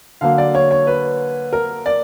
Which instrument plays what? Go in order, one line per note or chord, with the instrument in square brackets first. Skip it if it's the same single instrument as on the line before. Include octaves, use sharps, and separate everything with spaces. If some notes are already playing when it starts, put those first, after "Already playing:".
[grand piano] D3 F#3 A#3 F5
D5
C#5
C#5
B4
A#4
D5